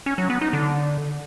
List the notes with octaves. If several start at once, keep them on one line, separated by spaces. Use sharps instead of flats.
C#4
F#3
B3
D#4
D3